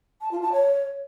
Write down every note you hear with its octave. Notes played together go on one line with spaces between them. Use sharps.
A5
F4
A5
C#5